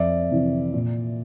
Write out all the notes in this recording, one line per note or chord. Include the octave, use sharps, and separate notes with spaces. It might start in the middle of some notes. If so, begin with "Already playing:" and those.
Already playing: F2 D5 E5
C3 E3
A#2